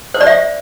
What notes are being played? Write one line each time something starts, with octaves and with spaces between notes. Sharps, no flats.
C5
D5
E5